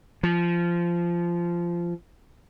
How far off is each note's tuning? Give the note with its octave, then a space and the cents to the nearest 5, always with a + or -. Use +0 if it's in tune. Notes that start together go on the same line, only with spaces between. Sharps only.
F3 -15